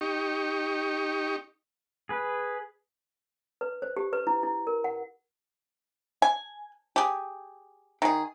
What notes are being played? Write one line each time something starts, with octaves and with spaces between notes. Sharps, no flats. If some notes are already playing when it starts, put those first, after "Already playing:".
D#4 G4 C#6
G#4 B4
B4
C5
G4
B4
E4
E4
A#4
F#5
G#5
G4 G#4
D#3 G#4